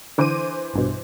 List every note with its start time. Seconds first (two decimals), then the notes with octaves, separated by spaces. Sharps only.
0.18 D3 E3 C5 D6 D#7
0.73 A#1 G2 B2